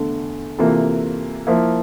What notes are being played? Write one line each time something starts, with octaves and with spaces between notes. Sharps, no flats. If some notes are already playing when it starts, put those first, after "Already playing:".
Already playing: E2 D3 A3
C3 E3 A#3 F4 A4
F3 A#3 E4